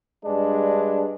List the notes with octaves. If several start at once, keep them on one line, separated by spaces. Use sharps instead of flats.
G2 G#3 D4